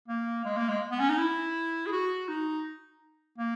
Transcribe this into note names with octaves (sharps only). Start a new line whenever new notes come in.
A#3
G#3
A#3
G#3
B3
C#4
D#4
E4
G#4
F#4
D#4
A#3